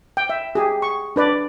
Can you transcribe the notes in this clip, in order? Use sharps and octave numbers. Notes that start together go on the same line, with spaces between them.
G5
E5
G4 G#4
C#6
D4 B4 D5